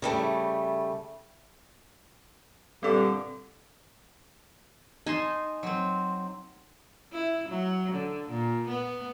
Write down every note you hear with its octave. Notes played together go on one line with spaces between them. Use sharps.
C#3 G3 A3
G2 A#2 D3 G3 C4 A4
D#4 G#5 A5 C6
F#3 C4
E4
F#3
D3
A#2
B3